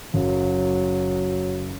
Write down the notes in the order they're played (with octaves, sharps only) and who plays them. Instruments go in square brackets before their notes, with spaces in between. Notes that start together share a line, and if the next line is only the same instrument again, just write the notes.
[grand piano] F#1 [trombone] F#3